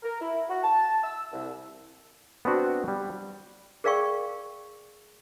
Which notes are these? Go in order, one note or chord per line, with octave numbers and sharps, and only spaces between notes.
A#4
E4
F#4
A5
E6
C2
B3 C4 D4 F#4
G3
G#4 A#4 D5 F5 G5 C#6